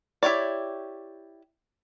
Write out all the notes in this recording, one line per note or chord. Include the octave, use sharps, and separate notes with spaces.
E4 G4 C#5 D5